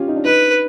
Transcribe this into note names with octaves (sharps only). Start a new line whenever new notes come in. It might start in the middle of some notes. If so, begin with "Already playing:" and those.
Already playing: C#4 F4 G4
D#4
D4
D#4 B4